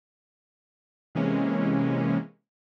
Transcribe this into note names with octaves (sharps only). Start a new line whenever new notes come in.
C3 E3 G#3 A#3 C#4